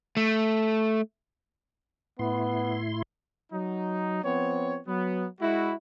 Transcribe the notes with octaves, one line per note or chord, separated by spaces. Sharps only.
A3
A2 B3 E4 C6
F#3 D#4
F3 B3 C4 C#5
F#3 B3
G#3 E4 F#4